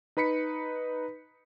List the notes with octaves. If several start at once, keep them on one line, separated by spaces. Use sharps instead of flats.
D#4 B4 B5 B6 C#7